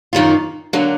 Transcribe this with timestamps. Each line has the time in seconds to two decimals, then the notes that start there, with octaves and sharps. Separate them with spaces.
0.13 F#2 D#3 A#3 F4
0.73 D3 F#3 A#3